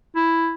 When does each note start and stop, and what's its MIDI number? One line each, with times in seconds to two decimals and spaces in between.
0.16 0.52 64